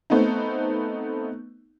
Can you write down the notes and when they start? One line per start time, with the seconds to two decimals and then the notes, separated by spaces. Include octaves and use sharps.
0.10 A3 B3 C4 D#4